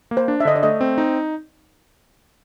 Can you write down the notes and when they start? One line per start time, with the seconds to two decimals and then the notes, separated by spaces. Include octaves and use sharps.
0.11 A#3
0.17 C5
0.28 D4
0.40 E5
0.45 D3 D#5
0.56 D5
0.63 A3 D#5
0.81 C4
0.98 D#4